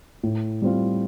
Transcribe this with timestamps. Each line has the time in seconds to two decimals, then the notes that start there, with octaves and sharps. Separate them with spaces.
0.23 A2
0.62 G3 C4 F4